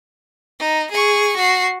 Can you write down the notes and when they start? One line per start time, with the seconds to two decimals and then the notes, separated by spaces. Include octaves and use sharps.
0.60 D#4
0.91 G#4 C#6
1.37 F#4 C7